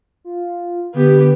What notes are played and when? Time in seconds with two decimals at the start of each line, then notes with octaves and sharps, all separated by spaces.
0.24 F4
0.94 D3 B3 G4